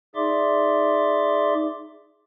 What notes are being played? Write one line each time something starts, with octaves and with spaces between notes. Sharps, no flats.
D#4 G#4 D5 E5 C6 D6